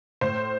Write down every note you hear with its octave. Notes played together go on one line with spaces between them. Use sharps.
A2 C5